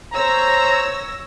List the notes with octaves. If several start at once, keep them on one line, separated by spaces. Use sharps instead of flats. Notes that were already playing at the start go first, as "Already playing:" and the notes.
C5 C#5 A#5 E6 A#6